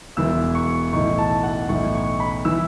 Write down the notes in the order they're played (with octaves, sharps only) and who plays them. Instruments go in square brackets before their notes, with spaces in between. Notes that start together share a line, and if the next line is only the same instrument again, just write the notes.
[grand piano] E1 E2 E3 E6
C#6
B1 A2 E3 C#6
A5
F#5
B1 A2 E3 C#6
C#6
B5
E3 E6